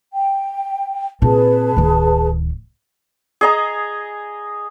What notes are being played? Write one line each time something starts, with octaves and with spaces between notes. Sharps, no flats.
G5
A#2 C4 G#4 B4 A5
D1 D#3
G#4 D#5 A#5